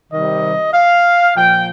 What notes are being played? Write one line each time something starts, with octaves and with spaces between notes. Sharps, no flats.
C3 D#3 G3 D#5
F5
A#2 F3 G5